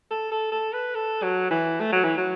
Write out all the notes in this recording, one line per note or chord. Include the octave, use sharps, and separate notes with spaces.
A4
A4
A4
B4
A4
F#3
E3
A3
F#3
E3
F#3